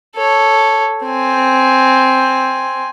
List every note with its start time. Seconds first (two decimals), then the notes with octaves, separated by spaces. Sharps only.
0.16 A4 C#5
1.04 C4 G#5